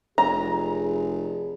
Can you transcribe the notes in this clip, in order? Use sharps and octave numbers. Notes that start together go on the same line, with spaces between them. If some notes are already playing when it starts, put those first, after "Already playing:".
F1 G#4 A#5